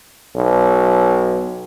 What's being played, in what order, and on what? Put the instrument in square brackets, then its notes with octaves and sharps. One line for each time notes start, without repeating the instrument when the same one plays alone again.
[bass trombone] B1